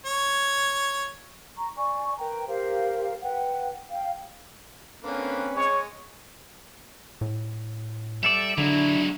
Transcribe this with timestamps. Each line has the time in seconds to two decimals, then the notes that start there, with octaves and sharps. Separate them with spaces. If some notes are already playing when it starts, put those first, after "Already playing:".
0.06 C#5
1.56 A#5 C#6
1.76 D5 G#5 C#6
2.18 A#4 B4 G5 A#5
2.47 G4 A#4 C5 F5
3.21 B4 F#5 G5
3.89 F5 G5
5.04 D3 A#3 C4 C#4 B4
5.55 G#3 C#5
7.21 A2
8.23 G3 A4 D5 E5
8.58 D3 F#3 G#3 D4 E4